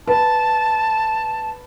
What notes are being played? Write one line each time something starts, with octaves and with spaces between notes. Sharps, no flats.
B4 A5